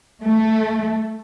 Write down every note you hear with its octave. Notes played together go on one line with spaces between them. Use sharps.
A3